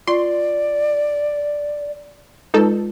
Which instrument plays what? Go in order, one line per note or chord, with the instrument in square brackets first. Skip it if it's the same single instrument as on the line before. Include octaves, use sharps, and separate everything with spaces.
[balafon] F4 [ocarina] D5 [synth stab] C6
[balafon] G#3 F4 B4 [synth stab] D#4 A4